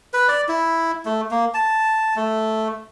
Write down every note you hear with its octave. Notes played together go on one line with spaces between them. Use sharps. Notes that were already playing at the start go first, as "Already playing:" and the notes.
B4
D5
E4
A3
A#3
A5
A3